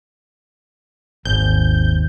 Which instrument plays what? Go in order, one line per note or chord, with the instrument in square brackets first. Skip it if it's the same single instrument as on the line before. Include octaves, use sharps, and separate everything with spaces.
[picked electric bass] G#1 [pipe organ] D#2 [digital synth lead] G6